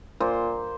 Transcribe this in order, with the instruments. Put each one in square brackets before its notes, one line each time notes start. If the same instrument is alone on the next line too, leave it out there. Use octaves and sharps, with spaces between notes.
[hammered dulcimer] A#2 C5